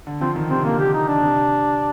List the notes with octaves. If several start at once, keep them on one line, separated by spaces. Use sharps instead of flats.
D3
F3 C4
D#3
C3 C4
D3 A#3
G4
D#4
D4
C3